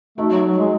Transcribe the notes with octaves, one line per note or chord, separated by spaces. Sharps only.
A3 D#4 F#4
F#3
F#3
G#3